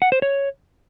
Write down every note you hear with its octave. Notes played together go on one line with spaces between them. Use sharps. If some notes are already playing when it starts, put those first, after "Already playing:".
F#5
C5
C#5